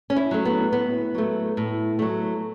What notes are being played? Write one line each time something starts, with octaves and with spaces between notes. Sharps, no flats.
C#4
E4
F#3 A3
B3
A2 B3
F#3 A3
A2
F#3 A3